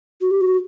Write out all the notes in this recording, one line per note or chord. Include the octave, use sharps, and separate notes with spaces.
F#4
G4
F#4